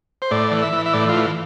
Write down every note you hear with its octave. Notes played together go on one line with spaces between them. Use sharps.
C5
A2 D5
E3
E5
E3
E5
A2 D5
F4
E3